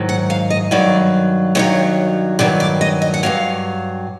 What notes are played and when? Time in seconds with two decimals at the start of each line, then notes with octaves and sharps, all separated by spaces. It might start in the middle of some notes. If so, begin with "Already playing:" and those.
Already playing: G#2 D#3 F#3
0.09 F#5
0.30 F5
0.50 D#5
0.71 G2 D#3 F#3 D5
1.55 G2 D#3 F#3 C#5
2.39 G2 D#3 F#3 D5
2.60 D5
2.81 D#5
3.02 D#5
3.14 F#5
3.23 G2 D#3 F#3 F5